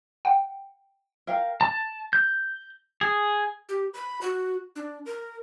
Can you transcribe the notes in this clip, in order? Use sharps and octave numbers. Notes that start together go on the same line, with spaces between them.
F#5 G5
A#4 F5 G5
A5
G6
G#4
G4
B5
F#4
D4
A#4